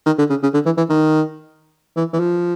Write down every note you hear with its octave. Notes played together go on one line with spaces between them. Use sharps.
D#3
D3
C#3
C#3
D3
E3
E3
D#3
E3
E3
F3